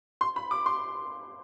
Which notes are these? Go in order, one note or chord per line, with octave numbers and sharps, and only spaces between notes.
C6
B5
D6
C6